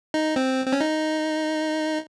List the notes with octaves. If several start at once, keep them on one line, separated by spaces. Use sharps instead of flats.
D#4
C4
C4
C#4
D#4